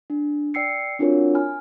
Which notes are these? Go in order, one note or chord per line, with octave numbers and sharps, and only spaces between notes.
D4
D5 G5 E6 C7 C#7
C4 D4 F4 F#4 A#4 C#5
G#5 B5 F6